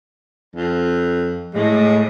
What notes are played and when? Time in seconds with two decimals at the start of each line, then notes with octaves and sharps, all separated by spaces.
0.55 F2
1.54 A2 G#3